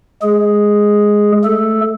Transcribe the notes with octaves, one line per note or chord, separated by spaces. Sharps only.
G#3 G#4
A3 A4